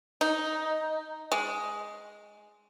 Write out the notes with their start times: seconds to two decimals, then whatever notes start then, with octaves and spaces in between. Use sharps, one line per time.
0.21 D#4
1.32 G#3